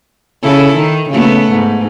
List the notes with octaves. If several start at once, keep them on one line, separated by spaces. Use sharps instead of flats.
C#3 E4 A4
D#3
C#3 A3 B3
G#2